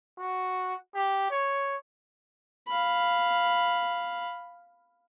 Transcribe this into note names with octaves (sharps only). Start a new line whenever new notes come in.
F#4
G4
C#5
F5 B5